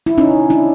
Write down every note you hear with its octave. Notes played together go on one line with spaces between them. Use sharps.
E4
C#4 D#4
D4 E4